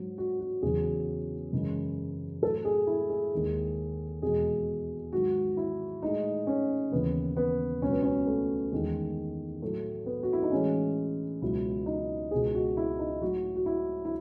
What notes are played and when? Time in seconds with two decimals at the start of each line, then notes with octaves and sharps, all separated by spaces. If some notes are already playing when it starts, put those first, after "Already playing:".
Already playing: G#2 F#3
0.18 F#4
0.40 F#4
0.62 E2 C#3 F#3 G#4
1.52 F#2 C#3 E3 G#3
2.42 A2 F#3 A4
2.65 G#4
2.87 E4
3.10 G#4
3.32 D#2 D#3 G#3
4.22 E2 B2 G#3 G#4
5.12 G#2 D#3 F#3 F#4
5.57 E4
6.02 A2 G#3 D#4
6.47 C#4
6.91 D#2 C#3 E3 B3
7.37 B3
7.81 C#2 B2 F#3 C#4
7.92 B3
8.03 C#4
8.27 A3
8.72 E2 D#3 G#3
9.62 A2 F#3 A3
10.06 B3
10.23 F#4
10.33 E4
10.43 D#4
10.51 A2 E3 G#3 C#4
11.42 C#2 B2 F#3 E4
11.86 D#4
12.31 C#2 B2 G#3 G#4
12.55 F#4
12.77 E4
12.99 D#4
13.22 A2 F#3 F#4
13.56 F#4
13.66 E4
14.05 E4